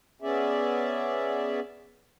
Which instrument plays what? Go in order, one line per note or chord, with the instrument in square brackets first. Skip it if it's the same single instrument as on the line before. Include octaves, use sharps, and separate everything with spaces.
[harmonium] B3 C#4 G#4 D5 E5